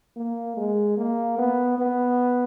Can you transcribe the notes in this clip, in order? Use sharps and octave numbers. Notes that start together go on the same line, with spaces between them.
A#3
G#3
A#3
B3
B3